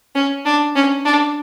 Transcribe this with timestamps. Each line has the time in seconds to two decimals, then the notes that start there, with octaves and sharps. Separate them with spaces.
0.15 C#4
0.46 D4
0.75 C#4
1.05 D4